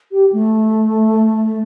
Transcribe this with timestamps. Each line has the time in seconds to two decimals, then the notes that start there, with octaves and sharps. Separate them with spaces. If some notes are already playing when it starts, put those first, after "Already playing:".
0.12 G4
0.33 A3